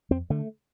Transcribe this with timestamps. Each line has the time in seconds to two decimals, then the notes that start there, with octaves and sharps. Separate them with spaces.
0.11 F2 C4
0.30 D3 A3